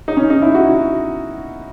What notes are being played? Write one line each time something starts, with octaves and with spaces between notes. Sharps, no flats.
D#4
C#4
D#4
E4
F#4